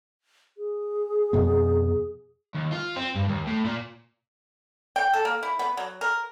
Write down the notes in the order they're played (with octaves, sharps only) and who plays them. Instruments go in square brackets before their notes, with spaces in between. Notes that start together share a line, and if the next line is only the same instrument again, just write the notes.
[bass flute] G#4
[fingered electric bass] F2 B2 B3
[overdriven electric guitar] D#2
F4
C4
G2
D#2
A2
A#2
[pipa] G5
A4
A#3
E4
B3
F#3
A#4